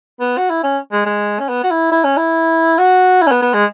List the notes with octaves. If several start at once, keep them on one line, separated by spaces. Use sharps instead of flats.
B3
F#4
E4
C#4
G#3
G#3
C#4
B3
F#4
E4
E4
C#4
E4
F#4
E4
C#4
B3
B3
G#3